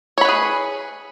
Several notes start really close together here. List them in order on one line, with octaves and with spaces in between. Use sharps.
C#5 B5 B4 G#4